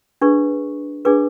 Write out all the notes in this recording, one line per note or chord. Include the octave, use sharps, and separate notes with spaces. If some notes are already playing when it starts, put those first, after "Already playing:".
D4 G#4 B4 C#6
D4 G#4 B4 D6